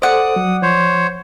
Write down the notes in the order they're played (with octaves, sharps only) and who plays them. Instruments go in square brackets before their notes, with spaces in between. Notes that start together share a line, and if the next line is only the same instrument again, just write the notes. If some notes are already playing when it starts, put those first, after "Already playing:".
[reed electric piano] A4 C5 [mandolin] D5 F#5 [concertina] D#6
[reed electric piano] F#3
[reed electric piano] F3 [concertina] C5 C#5